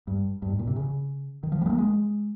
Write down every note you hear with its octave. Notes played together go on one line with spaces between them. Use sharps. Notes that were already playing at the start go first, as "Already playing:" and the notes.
G2
G2
G#2
A#2
C3
C#3
D#3
F3
G3
G#3
A#3
G#3